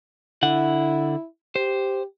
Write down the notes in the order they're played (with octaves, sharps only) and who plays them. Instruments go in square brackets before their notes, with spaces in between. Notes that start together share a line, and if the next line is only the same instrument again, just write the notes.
[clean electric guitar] D3 F#5 [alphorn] E4
[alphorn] G4 [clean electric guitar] C5